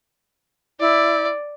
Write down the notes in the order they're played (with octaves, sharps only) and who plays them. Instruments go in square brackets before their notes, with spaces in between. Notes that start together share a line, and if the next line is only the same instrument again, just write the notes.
[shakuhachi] E4 [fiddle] D5